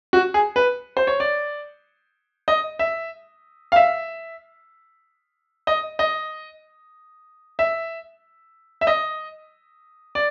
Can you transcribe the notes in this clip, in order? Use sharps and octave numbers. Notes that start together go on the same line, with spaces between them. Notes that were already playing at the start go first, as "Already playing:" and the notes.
F#4
G#4
B4
C5
C#5
D5
D#5
E5
F5
E5
D#5
D#5
E5
E5
D#5
D5